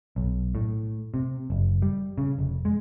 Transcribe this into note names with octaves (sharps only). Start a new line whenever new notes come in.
B1
A2
C3
F#1
G3
C#3
F1
G#3